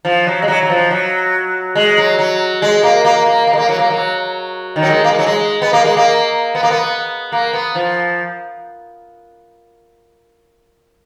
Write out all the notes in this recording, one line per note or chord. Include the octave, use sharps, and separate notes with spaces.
F3
F#3
G#3
F#3
F#3
F3
F#3
G#3
F#3
F#3
G#3
A#3
A#3
A#3
A#3
G#3
A#3
F#3
A#3
F#3
D#3
F#3
G#3
A#3
G#3
F#3
G#3
B3
A#3
G#3
A#3
B3
A#3
B3
A#3
B3
F3